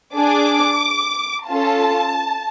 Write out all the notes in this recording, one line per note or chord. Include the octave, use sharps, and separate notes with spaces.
D4 G#4 D6
C#4 F4 A4 A5